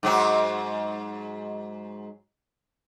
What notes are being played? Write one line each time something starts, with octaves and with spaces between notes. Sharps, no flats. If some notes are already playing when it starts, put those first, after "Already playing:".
G#2 F#3 F#4